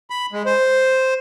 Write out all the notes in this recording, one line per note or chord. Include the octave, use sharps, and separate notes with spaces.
B5
G#3
C5